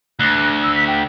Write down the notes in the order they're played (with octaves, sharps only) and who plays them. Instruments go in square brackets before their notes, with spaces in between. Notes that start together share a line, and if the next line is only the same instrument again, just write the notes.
[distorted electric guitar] D2 [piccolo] F#6
[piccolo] E6
B6
G5